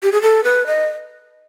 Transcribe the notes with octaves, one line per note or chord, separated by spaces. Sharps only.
G4
G#4
A4
B4
D#5